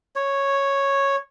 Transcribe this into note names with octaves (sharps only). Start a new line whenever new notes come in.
C#5